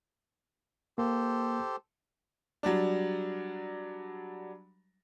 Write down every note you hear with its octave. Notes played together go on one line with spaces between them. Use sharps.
A#3 G4 A4 C5
F#3 G3 D4